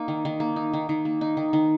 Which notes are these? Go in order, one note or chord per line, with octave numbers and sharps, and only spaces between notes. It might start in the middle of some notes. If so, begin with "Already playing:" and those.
Already playing: A#3 D#4
D#3
D#3
A#3
D#4
D#3
D#3
A#3
D#4
D#3
D#3